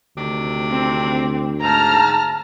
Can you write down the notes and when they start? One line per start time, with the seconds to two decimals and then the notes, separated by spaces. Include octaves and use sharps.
0.17 D2 C3 D#3 D4
0.71 C4
1.63 G#2 A5 A#5 F6